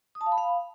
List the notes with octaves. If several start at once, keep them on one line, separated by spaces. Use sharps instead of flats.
D#6
A5
F5
B5
F5